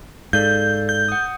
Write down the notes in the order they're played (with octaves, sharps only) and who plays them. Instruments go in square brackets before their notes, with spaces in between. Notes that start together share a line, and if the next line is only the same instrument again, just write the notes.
[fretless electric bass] G#2 [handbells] A4 D5 F5 [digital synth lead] G6
[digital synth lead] G6
[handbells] F#5 D#6